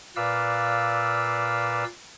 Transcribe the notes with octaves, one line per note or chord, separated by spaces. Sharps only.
A#2 B4 D5 F5 E6